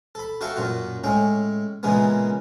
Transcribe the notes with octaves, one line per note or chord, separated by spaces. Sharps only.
A4 B5
F#4 A4 E5 F5 G5 C#6
F#2 A#2 F4 F#4
A2 G#3 C#4 G5
A#2 C#3 E3 G#3 A#3 B3